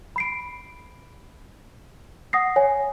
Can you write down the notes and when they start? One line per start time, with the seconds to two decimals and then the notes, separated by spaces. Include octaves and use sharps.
0.16 B5 C7 D7
2.33 F#5 D#6 A#6 C7
2.56 C#5 G#5